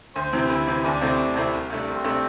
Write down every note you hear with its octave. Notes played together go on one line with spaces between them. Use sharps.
D2 C5
C3 E3 C4
D2 E4
C3 E3 C4
D2 D4
C3 A3 C4 E4
D2
C3 A3 C4 E4
C2
C3 A3 D4
C2 C4
C3 A3 D4